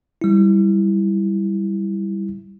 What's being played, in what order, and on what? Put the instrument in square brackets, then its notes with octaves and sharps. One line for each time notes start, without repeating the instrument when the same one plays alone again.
[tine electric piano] G3 E4